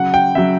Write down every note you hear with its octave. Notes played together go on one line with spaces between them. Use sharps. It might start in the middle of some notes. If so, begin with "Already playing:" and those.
Already playing: C#3 F#3 F#5
G5
C#3 F#3 E5